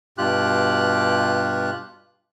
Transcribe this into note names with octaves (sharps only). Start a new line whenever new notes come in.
G2 B2 F4 G4 F#6